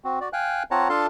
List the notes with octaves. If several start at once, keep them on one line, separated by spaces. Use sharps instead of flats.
C4 F#4
F#4 D5
F5 G5 G#5 F#6
C4 F4 C#5 F#5 A5 A#5
D4 F4 A4 F5 A5 C6